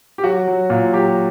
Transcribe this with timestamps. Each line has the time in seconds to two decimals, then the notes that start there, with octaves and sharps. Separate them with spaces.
0.18 G4
0.24 F#3 F#4
0.47 F#3
0.70 A#2
0.93 F#3 G4